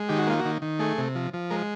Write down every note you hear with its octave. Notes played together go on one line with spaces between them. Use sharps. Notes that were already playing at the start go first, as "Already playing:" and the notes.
Already playing: G#3
D#3 G4
F#4
A#3 F4
F#4
D#3
D#3
A3 G#4
C3
F3
F3
G#3 A#4